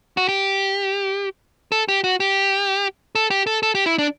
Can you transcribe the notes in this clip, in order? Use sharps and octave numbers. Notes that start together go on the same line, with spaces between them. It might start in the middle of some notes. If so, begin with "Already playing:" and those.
F#4
G4
A4
G4
F#4
G4
A4
G4
A4
A4
G4
E4
D4